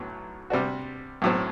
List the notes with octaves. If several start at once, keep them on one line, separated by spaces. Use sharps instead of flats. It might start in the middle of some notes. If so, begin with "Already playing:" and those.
Already playing: B1 A2 F#3 B3
C3 G3 D4 F#4
B1 A2 F#3 C4